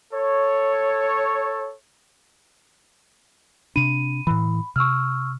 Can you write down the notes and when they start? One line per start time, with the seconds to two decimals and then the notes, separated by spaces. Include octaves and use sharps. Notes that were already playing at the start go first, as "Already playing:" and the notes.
0.13 A4 C#5
3.76 C3 D4 B5 D#7
4.27 A2 E3 B5
4.76 C3 C#6 E6 F6